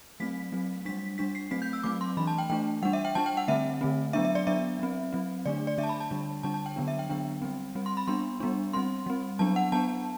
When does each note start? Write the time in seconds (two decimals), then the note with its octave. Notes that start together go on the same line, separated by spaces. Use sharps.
0.20 F#3 A3 C4 B6
0.52 F#3 A3 C4
0.85 G3 D4 B6
1.18 G3 D4 B6
1.35 C7
1.51 F#3 A3 C4 B6
1.62 G6
1.73 E6
1.83 F#3 A3 C4 D6
2.01 C6
2.17 E3 A3 D4 B5
2.27 A5
2.38 G5
2.50 E3 A3 D4 G5
2.82 G3 D4 F#5
2.93 E5
3.05 G5
3.15 G3 D4 A5
3.26 G5
3.37 F#5
3.48 D3 A3 C4 E5
3.81 D3 A3 C4
4.13 F#3 B3 D4 E5
4.25 E5
4.35 D5
4.47 F#3 B3 D4 E5
4.79 F#3 C4
5.13 F#3 C4
5.45 D3 A3 D4 D5
5.67 D5
5.78 D3 A3 D4 E5
5.84 A5
5.89 B5
6.00 A5
6.11 D3 G3 D4
6.43 D3 G3 D4 A5
6.54 A5
6.66 G5
6.76 D3 F#3 B3 D4
6.88 E5
6.99 G5
7.09 D3 F#3 B3 D4 G5
7.42 G3 C4
7.75 G3 C4
7.86 C6
7.97 B5
8.08 G3 B3 D4 C6
8.40 G3 B3 D4
8.73 G3 C4 C6
9.06 G3 C4
9.39 F#3 B3 D4 A5
9.56 F#5
9.72 F#3 B3 D4 A5